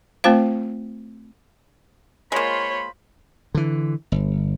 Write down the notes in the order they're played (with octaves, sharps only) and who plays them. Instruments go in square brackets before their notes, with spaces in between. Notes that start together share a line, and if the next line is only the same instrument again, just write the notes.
[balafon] A3 C4 F4 C5 F5
[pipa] G#3 A#3 [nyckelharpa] F4 C5 [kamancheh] C#5 [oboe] B5
[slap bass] D3 E3
G1